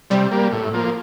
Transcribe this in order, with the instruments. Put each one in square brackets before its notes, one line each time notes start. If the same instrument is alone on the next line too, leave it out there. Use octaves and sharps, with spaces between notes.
[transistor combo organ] C3 [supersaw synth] G3
[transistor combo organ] G3 A#3
A2
F3 A#3